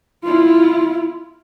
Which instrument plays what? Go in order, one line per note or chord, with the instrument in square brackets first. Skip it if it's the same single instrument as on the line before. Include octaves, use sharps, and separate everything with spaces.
[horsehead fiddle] E4 F4